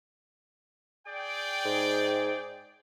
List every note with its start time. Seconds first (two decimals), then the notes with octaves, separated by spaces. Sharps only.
1.06 G#4 D5 G5
1.65 G#2